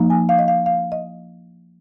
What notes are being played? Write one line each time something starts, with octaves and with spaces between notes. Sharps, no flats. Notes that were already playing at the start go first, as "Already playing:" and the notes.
Already playing: F3 A#3 D#4
G#5
F5
D#5
F5
F5
D#5